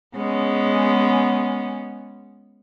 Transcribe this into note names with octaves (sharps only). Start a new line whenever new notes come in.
G#3 B3 C#4